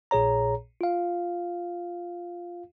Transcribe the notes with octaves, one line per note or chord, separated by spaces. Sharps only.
A#1 A#2 G#4 C#5 A#5
F4 F5